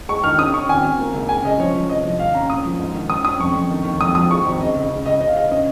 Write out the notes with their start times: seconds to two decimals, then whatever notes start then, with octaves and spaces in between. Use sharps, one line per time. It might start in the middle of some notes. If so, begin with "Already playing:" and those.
0.09 G#3 C#6
0.24 D#3 F6
0.39 C#4 D#6
0.54 C#4 C#6
0.69 G#1 G#5
0.85 G#1
0.99 A#3
1.14 C#2
1.29 C#3 G#5
1.44 C#3 D#5
1.60 F3 C#5
1.75 F3
1.89 F1 D#5
2.05 F3
2.20 D#2 F5
2.35 C#4 A#5
2.50 A#2 D#6
2.65 F3
2.79 G#2
2.95 D#3
3.10 C#4 D#6
3.25 C#4 D#6
3.40 F2 C#6
3.55 F2
3.70 D#3
3.85 D#2
4.01 F2 D#6
4.15 F3 D#6
4.30 G#3 C#6
4.46 G#1
4.61 C#3 D#5
4.76 C#2
4.91 C#3
5.06 C#2 D#5
5.21 C#3 D#5
5.28 F5
5.36 C#2 D#5
5.51 C#4 D#5